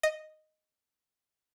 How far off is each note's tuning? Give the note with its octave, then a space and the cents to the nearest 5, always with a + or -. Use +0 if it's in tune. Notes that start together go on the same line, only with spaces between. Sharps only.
D#5 -5